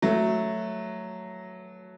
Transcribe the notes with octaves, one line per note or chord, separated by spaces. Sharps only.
F#3 A3